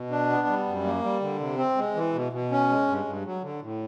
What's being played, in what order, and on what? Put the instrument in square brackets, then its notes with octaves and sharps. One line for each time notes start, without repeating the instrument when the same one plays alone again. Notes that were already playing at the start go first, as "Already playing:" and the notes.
Already playing: [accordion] B2
D4
B3
G3
F#2
A#3
G3
D3
C3
C4
G#3
E3
B2
B2
C#4
G#3
G2
G2
F#3
D3
A2